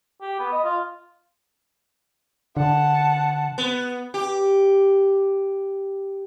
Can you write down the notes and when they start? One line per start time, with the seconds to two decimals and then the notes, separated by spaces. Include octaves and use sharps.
0.21 G4
0.39 B3
0.52 D#5
0.64 F4
2.57 D3 F#5 A5
3.58 B3
4.14 G4